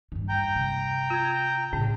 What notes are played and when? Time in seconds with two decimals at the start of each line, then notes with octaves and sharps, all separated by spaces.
0.12 G2 D#3
0.29 G5 A#5 G6
0.56 C3
1.10 F4 G#6
1.73 A2 C#3